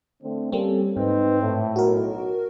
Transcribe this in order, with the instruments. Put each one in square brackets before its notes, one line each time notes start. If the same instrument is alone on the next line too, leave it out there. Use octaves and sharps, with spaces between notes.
[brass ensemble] D3 A3 C4
[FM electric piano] G3 A#3 C4 [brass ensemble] C#4 G4 A4
[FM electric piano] G#2 [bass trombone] C4 [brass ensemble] D#4 B4
[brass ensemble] A2
[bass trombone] B1 [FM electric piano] F#4 A#4